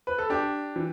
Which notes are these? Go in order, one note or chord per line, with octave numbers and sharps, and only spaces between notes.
B4
A4
D4 G4
E3